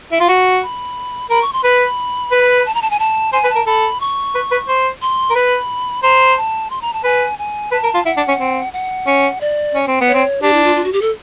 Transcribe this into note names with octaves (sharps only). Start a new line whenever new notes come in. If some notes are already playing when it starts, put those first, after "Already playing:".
E4
F4
F#4
B5
A#4 B5
C#6
C6
B4 B5
B4
A5
A#5
A5
G#5
A5
C5 G#5
B4
A5
A#4
A4 B5
C#6
B4
B4
C5
C6
A#4
B4 B5
C5 A#5
A5
C6
A#5
A5
B4 G#5
G#5
B4 A5
A#4
F4
E4 F#5
D4
C#4
C4
F#5
C#4
D5
C#4
C4
B3
C#5
C4
D4 G4
E4
F4
F4
F#4
G4
A4